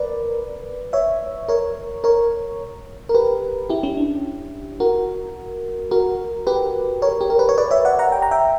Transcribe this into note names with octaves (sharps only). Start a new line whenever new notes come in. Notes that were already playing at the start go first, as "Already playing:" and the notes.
Already playing: A#4 B4 D5
C#5 E5
A#4 C#5
A#4 C#5
A#4
G4 B4
E4 G4
C#4 E4
D4
F#4 A#4
F#4 A#4
G4 B4
A#4 C#5
G4
A#4
B4
C#5
B4 D5
C#5 E5
D5 F#5
F#5 A#5
G5
A#5
E5 G5